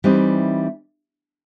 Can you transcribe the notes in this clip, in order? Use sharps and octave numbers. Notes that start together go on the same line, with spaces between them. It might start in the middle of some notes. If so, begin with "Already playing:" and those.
E3 G3 C4 D#4